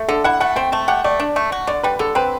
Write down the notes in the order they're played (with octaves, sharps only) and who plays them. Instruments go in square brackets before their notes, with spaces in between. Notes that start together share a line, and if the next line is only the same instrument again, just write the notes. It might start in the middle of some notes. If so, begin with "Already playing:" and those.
Already playing: [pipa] A3
[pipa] D3 [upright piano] A4
[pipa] E4 [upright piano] F#5
[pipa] A3 [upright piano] F#5
[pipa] C4 [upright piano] G5
[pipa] A3 [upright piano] A5
[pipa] G4 [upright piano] F#5
[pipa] A3 [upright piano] D5
[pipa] D4
A3
F#4
[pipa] D3 [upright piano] D5
[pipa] G3 [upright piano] B4
[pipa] D3 [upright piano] A4
[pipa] C4 [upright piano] B4